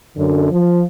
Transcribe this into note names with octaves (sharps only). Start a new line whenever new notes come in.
F#2 D3
F3